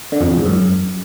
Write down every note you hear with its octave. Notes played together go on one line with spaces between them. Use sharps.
D3
F2
E2
G#2
F#2